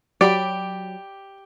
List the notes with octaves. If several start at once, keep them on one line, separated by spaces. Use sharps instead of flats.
F#3 G4 D5 B5 D6